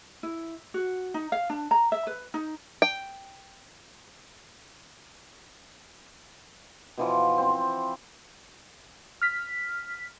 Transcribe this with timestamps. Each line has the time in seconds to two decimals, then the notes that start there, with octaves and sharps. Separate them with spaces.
0.23 E4
0.74 F#4
1.14 D#4
1.32 F5
1.50 D4
1.71 A#5
1.92 E5
2.07 B4
2.34 D#4
2.82 G5
6.97 B2 E3 F3
7.38 C4
9.22 F6 B6